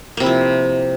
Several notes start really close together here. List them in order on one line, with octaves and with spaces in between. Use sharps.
A#3 C3 E4 F3